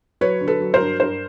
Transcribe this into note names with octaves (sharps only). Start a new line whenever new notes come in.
F#3 B4 C#5
D3
A4 B4
F#3
A#4 C5
G2
G2 A#4 C5